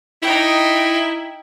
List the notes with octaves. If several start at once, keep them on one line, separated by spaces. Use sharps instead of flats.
D#4 E4 G5